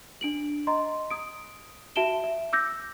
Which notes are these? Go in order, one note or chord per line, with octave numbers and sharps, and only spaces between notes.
D4 D7 F#7
D#5 A#5 C6
D#6 D7
F#4 E5 A5 D7 E7 G7
E5
D6 E6 G6 A#6